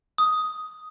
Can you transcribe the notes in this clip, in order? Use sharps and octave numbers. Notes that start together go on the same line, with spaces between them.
D#6